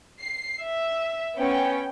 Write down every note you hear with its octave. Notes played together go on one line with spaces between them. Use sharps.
C7
E5
B3 C#4 G5